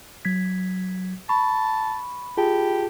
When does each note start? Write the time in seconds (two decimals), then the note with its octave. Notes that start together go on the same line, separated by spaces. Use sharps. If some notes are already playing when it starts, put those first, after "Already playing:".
0.25 F#3 G#6 B6
1.29 A5 B5 C#6
2.37 F4 G4 G#4 A5